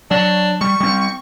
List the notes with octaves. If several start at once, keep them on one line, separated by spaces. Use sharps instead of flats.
F#3 D4
G3 C#6
G3 C4